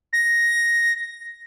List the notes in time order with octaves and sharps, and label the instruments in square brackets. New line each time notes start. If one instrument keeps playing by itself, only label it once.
[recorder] A#6